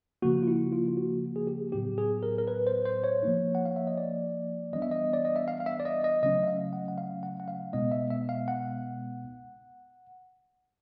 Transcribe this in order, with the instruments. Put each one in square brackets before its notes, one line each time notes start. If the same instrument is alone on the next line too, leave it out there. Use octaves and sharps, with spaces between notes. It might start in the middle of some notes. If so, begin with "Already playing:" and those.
[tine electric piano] C#3 F3 A#3 F#4
F4
E4
F4
F4
F#4
G#4
G4
A2 F#3 B3 D#4 G4
G#4
A#4
A#4
B4
C5
C5
C#5
F3 A#3 D#4
F#5
F5
E5
D#5
D5
E3 G3 B3 D4 D#5
E5
D#5
D5
D#5
E5
F5
F5
E5
D5
D#5
D#5
C#3 F#3 A3 C#4 D#5
E5
F5
F#5
F#5
F5
F#5
F#5
F5
B2 G#3 B3 D#4 D#5
E5
E5
F5
F#5